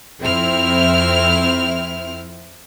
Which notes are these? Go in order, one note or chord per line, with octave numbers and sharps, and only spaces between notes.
F2 C4 E4 F6